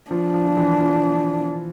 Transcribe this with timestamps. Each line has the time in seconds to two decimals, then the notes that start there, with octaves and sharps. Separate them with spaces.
0.11 F3 D4
0.34 F3
0.47 F3
0.57 E3
0.80 F3